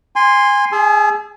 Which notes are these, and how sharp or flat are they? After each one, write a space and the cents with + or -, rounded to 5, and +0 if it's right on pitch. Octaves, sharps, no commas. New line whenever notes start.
G#5 -25 C6 +0
G#4 -15 G#5 +45 E6 +5